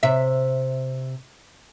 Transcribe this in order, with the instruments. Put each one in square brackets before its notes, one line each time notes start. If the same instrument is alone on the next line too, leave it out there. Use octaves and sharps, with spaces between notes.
[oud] C3 E5